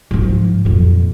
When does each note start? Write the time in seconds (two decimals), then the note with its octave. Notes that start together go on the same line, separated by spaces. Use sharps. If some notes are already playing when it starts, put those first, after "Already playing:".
0.11 G#2 F3
0.65 F2 A#2